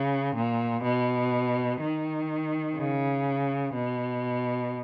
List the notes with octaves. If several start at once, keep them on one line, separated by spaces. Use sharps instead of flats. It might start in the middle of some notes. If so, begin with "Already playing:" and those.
Already playing: C#3
A#2
B2
D#3
C#3
B2